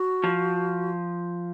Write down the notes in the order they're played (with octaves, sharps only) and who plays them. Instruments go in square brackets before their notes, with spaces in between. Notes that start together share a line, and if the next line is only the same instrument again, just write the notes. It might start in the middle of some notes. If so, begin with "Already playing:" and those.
Already playing: [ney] F#4
[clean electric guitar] F3